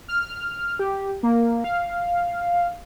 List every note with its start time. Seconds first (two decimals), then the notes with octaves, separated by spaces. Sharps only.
0.08 F6
0.79 G4
1.23 A#3
1.64 F5